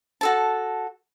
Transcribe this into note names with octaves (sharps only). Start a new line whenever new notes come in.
F#4 A4 A5